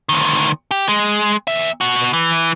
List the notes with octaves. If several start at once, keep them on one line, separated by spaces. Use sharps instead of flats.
D2 D#3
G4
G#3
E2 E5
B2 F#4
E3